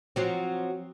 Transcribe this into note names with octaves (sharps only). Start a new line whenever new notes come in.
F3 F#3 C4